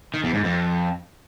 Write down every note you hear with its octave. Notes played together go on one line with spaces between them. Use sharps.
D#3
E2
G#2
F2